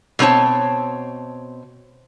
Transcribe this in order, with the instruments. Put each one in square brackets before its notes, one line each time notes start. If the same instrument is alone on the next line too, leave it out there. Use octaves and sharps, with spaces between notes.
[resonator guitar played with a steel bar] B2 C4 B4 C#5 A5